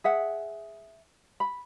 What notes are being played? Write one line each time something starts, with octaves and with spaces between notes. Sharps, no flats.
G#4 E5 F#5
B5